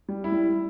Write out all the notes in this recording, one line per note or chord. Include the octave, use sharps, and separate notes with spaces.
G3
E4
G3